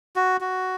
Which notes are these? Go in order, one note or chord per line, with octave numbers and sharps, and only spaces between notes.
F#4
F#4